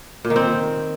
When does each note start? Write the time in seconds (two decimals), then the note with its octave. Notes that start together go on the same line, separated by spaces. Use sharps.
0.25 A#2
0.30 D#3
0.36 C4